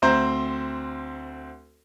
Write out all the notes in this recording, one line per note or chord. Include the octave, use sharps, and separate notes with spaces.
D2 C4 C5 A#5